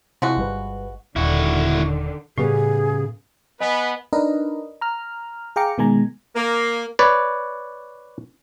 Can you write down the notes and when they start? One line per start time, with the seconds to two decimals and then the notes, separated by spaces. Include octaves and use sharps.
0.22 C3 F3 G#3 E4 F#4
0.37 G1 G3 B4
1.16 D#1 D3 D#3 E4 F#4
2.38 A2 C#3 G3 B3 G#4
3.61 B3 B4 D#5 G#5 B6
4.13 D4 D#4 A#4 B4 D#5
4.81 A#5 F6
5.56 G#4 F5 G5 A#5 D6 C#7
5.78 B2 D#3 G#3 G#5 A#5
6.35 A#3
6.99 B4 C#5 D5